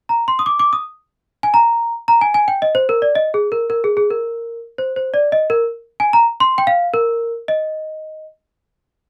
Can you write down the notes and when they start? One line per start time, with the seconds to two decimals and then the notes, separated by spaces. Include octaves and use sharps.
0.09 A#5
0.28 C6
0.39 D#6
0.46 D6
0.59 D6
0.73 D#6
1.43 G#5
1.54 A#5
2.08 A#5
2.21 G#5
2.34 G#5
2.48 G5
2.62 D#5
2.75 C5
2.89 A#4
3.02 D5
3.15 D#5
3.34 G#4
3.52 A#4
3.70 A#4
3.84 G#4
3.97 G#4
4.10 A#4
4.78 C5
4.96 C5
5.14 D5
5.32 D#5
5.50 A#4
6.00 G#5
6.13 A#5
6.40 C6
6.58 G5
6.67 F5
6.94 A#4
7.48 D#5